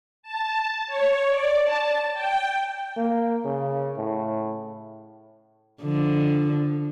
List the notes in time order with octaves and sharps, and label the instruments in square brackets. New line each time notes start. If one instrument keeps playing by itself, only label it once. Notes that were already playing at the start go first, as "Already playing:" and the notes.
[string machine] A5
C#5
D5
A5
G5
[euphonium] A#3
C#3
A2
[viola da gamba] D3 F3